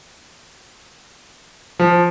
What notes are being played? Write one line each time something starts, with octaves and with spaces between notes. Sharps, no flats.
F3